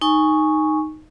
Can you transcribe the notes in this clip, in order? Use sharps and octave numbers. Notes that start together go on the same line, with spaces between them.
D#4 G#5 C#6